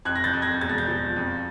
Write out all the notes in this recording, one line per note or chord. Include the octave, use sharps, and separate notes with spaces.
F2 F#6 G#6
A#6
G6 A6
F2
G#6 A#6
E1 A6
A#6
G6 A6
F3
F2